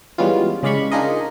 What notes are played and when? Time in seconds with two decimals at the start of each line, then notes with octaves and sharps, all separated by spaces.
0.18 E3 G3 G#3 B3 C#4 F4
0.63 C#3 G#3 D5 F5 B5 C#6
0.92 D4 D#4 F4 G#4 A#4 D#5